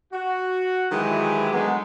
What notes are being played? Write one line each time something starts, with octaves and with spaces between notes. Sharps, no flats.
F#4
D#3 E3 F#3 G#3 E4 G4
F#3 G#3 A3 B3 D4 D#4